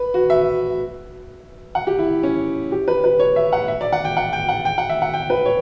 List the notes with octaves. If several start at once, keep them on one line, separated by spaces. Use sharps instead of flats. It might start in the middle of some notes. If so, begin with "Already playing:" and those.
Already playing: B4
F#4
E5
F#5
G4
E4
C#4
G4
B4
B4
C#5
E5
F#5
E5
D5
F#5
G5
F#5
G5
F#5
G5
F#5
E5
F#5
G5
B4
C#5